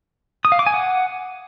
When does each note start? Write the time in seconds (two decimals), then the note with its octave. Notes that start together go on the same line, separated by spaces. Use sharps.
0.45 D#6
0.52 F5
0.59 D6
0.66 G#5
0.74 F#5